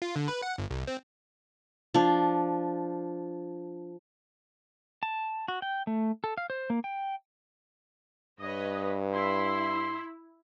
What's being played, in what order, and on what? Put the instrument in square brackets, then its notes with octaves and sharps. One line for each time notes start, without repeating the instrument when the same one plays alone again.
[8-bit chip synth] F4
D3
B4
F#5
G1
C2
C4
[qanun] F3 D4
[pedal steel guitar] A5
F#4
G5
A3
A4
F5
C5
A#3
G5
[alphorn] G2 [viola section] B4 C#5 D#5
[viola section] E4 [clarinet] C6